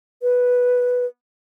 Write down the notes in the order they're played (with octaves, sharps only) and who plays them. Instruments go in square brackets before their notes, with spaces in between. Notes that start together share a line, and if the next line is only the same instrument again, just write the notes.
[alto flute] B4